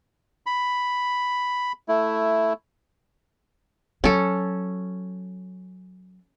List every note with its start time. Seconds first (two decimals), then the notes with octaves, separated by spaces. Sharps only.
0.46 B5
1.89 A3 E4
4.04 F#3 C#4 A4